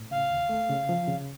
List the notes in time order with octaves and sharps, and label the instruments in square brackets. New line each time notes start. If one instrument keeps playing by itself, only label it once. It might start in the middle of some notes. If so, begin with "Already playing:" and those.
Already playing: [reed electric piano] A2
[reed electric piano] C#3 [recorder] F5
[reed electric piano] D#2
A3
C#3
F3
C#3